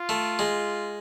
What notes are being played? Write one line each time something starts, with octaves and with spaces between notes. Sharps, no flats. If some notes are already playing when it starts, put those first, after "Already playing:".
Already playing: F4
A3
G#3